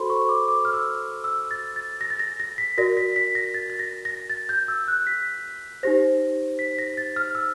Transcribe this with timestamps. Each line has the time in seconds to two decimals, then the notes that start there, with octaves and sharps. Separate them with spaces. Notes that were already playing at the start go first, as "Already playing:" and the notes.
Already playing: F#4 A4 C5 B5 C6
0.10 C#6
0.29 D6
0.48 D6
0.65 F6
0.73 E6
1.24 E6
1.51 A6
1.76 A6
2.01 A#6
2.10 A6
2.20 A#6
2.40 A#6
2.58 B6
2.78 F#4 A#4 D5 A#6
2.97 B6
3.16 B6
3.35 A#6
3.54 A6
3.70 A6
3.79 A#6
4.05 A#6
4.30 A6
4.49 G6
4.68 E6
4.88 F#6
5.07 B6
5.83 D#4 G4 C5 A#6
6.59 B6
6.78 A#6
6.97 A6
7.16 F6
7.35 E6